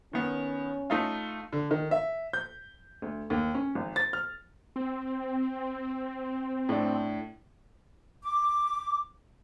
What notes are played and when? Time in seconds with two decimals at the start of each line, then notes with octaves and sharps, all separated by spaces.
0.13 D#3 B3 C#4
0.90 A3 D#4 F4
1.52 D3
1.71 D#3
1.91 E5
2.33 G6
3.02 D2
3.30 D#2
3.55 C#4
3.75 G#1
3.96 A6
4.13 F6
4.76 C4
6.69 A2 D4
8.24 D6